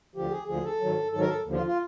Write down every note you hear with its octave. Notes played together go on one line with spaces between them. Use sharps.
D2 D3 F3 G4
G#4
D2 D3 F3 G#4
A4
G#2 D#3 F#3
G#2 D#3 F#3 A4
A#4
A4
D#2 D3 F3
F4
F4